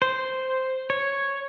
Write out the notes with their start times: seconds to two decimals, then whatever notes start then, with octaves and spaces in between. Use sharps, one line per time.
0.02 C5
0.90 C#5